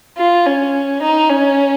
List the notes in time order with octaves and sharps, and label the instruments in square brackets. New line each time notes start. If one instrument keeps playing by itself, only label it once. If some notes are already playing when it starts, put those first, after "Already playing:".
[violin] F4
C#4
D#4
C#4